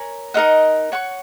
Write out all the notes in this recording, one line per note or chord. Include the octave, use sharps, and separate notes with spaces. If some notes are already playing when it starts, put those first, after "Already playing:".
Already playing: A#4 C#5 G#5 B5
D#4 A#4 D#5 F#5
C#5 F#5 C#6